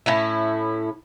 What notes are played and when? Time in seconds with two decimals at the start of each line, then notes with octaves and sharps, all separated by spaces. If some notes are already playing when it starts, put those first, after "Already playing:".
0.06 A2 C#4 E4